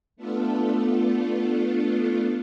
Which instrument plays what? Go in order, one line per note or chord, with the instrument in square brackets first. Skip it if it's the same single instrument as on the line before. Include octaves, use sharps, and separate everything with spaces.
[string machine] A3 B3 D4 F4 A4